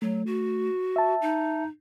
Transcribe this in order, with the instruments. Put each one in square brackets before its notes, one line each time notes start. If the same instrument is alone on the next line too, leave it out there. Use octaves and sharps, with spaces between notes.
[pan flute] F#3 [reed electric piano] A3
[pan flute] F#4
[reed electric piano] E5 A5
[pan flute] D#4